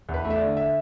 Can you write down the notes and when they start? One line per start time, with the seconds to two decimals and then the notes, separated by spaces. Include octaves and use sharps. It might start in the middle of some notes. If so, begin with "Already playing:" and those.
0.09 E2
0.14 B4
0.25 A3
0.30 E5
0.36 D5
0.42 D3
0.57 E5